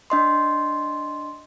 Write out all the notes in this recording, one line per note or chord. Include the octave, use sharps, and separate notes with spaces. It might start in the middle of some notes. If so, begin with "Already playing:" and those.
D4 D#5 C6